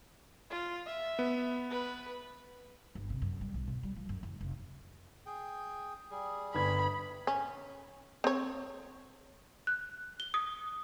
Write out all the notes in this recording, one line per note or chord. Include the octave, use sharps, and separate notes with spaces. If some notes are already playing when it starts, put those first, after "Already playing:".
F4
E5
B3
B4
G1
C3
F#2
G3
B1
B2
G3
F3
F#2
F#1
F1
G#4 G5
G3 G#4
G1 B5 G#6
C#4
C4 C#5
F#6
G7
D#6